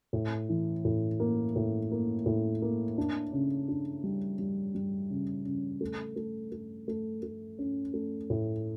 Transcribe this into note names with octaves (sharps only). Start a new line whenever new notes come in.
A2
E3
A2
A#3
A2
A#3
A2
A#3
D4
C#3
D4
G3
G3
G3
C#3
C#3
A3
A3
A3
A3
A3
C#4
A3
A2